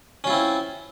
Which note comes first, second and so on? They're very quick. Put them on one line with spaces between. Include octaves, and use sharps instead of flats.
C#4 F4 E4 C4